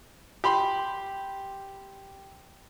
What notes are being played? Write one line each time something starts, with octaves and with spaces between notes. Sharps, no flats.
G4 B5 C6